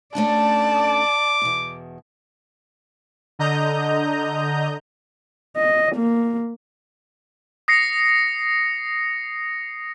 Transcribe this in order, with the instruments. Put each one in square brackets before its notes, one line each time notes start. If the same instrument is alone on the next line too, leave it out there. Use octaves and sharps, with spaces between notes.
[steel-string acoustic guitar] A3 C#4 D4 [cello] D5 [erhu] A5
[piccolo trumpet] D6
[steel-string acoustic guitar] E2 B2
[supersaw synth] D3 D#5 A#5 G6
[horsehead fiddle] D#5
A#3
[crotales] D#6 A#6 C7 C#7